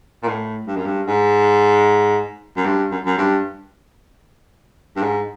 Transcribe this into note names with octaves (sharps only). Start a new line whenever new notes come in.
A#2
A2
G2
F#2
G2
G#2
F#2
G2
F#2
F#2
G2
G2
G#2